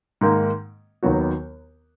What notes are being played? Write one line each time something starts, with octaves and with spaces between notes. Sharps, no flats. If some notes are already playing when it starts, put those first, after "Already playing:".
G#2 D#3 A#3
D#2 D#3 F#3 B3 F#4